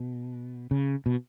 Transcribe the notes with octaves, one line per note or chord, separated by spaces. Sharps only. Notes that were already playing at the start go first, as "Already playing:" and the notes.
Already playing: B2
C#3
B2